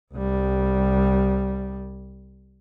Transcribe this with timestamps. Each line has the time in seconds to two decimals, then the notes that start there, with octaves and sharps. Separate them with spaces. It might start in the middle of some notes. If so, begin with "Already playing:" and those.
0.14 C2 G3